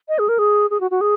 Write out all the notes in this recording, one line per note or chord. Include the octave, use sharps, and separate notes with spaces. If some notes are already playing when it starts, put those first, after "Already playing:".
D#5
G#4
A#4
G#4
G#4
F#4
F#4
G#4